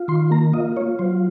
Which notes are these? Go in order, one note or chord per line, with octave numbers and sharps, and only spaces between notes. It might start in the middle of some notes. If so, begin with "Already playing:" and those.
Already playing: F4
D#3 C6
A#3 A#5
F4 D#5
F4 C#5
F#3 C5